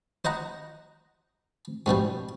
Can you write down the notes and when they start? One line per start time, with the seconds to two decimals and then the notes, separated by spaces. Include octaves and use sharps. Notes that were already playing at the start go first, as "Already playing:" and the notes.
0.25 C5 D#5 F#5 A#5
1.86 G#2 B2 F3 G3